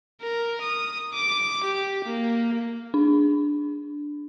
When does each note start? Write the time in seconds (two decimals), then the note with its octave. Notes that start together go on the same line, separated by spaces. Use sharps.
0.22 A#4
0.62 D#6
1.15 D6
1.64 G4
2.05 A#3
2.94 D4